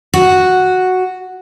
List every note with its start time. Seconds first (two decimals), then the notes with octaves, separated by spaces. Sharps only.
0.14 F#4